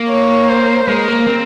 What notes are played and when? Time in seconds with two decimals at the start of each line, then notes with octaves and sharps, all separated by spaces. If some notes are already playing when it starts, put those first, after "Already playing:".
Already playing: A#3
0.09 C#5
0.50 C5
0.88 G#3 A#4
1.08 A#3
1.27 C4